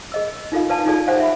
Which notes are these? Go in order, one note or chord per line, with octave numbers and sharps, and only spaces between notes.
G#4 D#5 E6
D#4 F4 A4 F5
B4 D5 F5 G#5 A5
D#4 F4 G#4 A4 D5
G4 C5 D5 F5 F#5 G#5
E5 G#5 B5